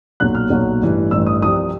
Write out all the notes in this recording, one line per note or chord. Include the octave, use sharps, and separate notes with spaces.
B1 A#2 F#3 F#6
F6
B1 A#2 F#3
A1 G2 E3
A1 G2 E3 E6
D#6
C2 C3 F3 D#6